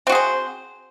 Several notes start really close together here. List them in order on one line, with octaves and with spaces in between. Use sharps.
C4 F#4 G#4 C5